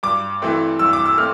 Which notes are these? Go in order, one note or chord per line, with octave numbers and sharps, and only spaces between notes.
G2 D6
E3 A3 C4
G2 E6
D6
E6
A3 C4 F6